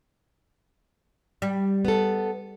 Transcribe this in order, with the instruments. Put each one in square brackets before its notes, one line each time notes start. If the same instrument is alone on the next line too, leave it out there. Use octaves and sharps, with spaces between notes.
[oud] G3
[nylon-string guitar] B3 A4